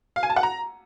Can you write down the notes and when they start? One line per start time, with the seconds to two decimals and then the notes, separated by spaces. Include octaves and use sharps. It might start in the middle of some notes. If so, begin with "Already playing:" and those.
0.16 F5
0.23 G#5
0.30 A5
0.36 F#5
0.43 A#5